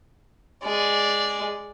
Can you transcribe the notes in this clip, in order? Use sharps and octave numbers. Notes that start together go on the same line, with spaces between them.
G#3 D5